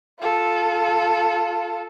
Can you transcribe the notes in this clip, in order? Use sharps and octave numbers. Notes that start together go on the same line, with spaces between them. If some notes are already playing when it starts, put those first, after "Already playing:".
F4 A4